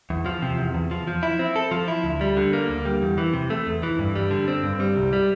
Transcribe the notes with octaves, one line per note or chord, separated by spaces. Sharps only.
E2
F3
C3
E2
E2
F3
F3
E4
C4
A4
F3
E4
D2
G3
D3
A#3
D2
G3
E2
E3
C3
A3
E2
E3
G2
G3
D3
C4
G2
G3
C2
G3